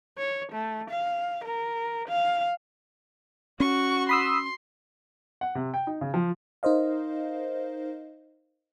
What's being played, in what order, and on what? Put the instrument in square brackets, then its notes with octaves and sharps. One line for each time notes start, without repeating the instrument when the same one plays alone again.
[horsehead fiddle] C#5
A3
F5
A#4
F5
[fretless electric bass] C#4 [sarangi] F#4 [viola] C#6
[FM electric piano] B5 D#6 E6 [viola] C6
[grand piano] F#5
C3
G5
D#4
C#3
F3
[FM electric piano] D#4 A#4 C5 D#5 F5